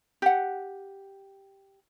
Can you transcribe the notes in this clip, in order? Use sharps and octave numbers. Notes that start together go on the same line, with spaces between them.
G4 F#5